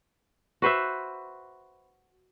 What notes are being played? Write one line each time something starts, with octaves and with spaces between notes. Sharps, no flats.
F#4 B4 C5 E5